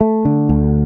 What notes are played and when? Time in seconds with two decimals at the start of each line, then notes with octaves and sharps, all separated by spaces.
0.01 A3
0.25 D3
0.49 D2